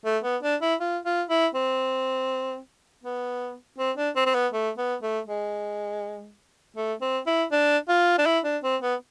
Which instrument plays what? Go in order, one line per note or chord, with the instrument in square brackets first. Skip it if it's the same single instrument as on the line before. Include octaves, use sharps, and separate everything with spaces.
[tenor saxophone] A3
B3
D4
E4
F4
F4
E4
C4
B3
C4
D4
C4
C4
B3
A3
B3
A3
G#3
A3
C4
E4
D4
F4
D4
E4
D4
C4
B3